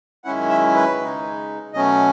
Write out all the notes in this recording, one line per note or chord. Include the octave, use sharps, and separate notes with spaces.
F#2 D#3 G#3 C#4 E4 F#5
E5
B4
C#3 G#3 D#4
B2 F#3 A3 C#4 D#5